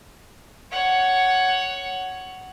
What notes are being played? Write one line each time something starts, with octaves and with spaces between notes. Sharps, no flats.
C#5 F#5